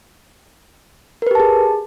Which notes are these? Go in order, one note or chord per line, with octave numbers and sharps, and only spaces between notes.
G4 G#4 A#4 B4 A5